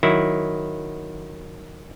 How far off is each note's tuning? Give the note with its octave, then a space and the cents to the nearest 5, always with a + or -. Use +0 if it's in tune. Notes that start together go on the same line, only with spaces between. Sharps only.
D#3 -10 F#3 +0 E4 +0